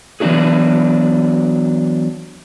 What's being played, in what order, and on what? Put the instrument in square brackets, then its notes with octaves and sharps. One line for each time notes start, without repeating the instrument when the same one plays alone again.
[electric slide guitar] E3 F#3 B3 D4 F#4 G#4